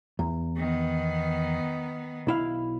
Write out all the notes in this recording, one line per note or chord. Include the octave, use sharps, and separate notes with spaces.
E2
D#3 B3
B1 E4 F5